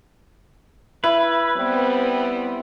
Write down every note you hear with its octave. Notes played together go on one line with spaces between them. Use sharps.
E4 B4
G3 B3 C4